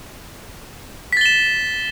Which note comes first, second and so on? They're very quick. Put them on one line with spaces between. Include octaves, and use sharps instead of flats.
B6 A6 G7 E7